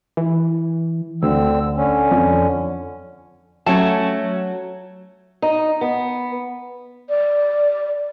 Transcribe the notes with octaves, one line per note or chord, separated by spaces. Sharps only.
E3
D2 D3 C4 E6
D3 C#4
F2
F#3 A3 C#4 C#5 F#5 A5
D#4
B3
D5